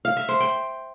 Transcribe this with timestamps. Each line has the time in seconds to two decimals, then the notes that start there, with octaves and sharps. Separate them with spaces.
0.05 F5
0.17 E5
0.29 C5
0.40 G5